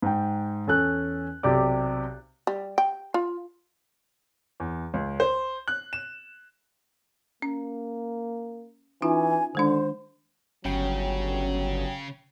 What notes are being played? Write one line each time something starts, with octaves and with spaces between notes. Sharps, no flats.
G#2 G5
E2 C#4 A4 G#5 F#6
B1 C3 G4 D5 D6
G3
G5
F4
E2
C#2
C5
F#6
E7
A#3 C#4
E3 C#4 D#4 F4 G#5
D3 D#3 G#3 D4 C5
G1 C#3 F#3 C#4 G5